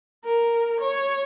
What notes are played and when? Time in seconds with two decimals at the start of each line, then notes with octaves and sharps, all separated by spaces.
0.24 A#4
0.81 C#5